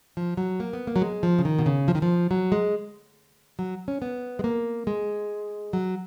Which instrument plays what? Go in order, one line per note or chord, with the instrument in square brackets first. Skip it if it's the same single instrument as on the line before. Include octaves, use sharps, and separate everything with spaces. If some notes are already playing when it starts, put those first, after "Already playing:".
[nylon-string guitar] F3
F#3
A#3
B3
A#3
F#3
G#3
F3
C#3
D#3
B2
C#3
F3
D#3
F3
F#3
G#3
F#3
C#4
B3
G#3
A#3
G#3
F#3